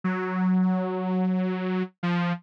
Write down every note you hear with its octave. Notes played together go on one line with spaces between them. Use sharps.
F#3
F3